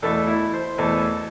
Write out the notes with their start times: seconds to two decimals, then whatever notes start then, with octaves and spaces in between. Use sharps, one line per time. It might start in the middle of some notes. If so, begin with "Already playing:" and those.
0.02 E2 B2 A3 A4
0.27 E4
0.54 C5
0.78 E2 B2 A3 A4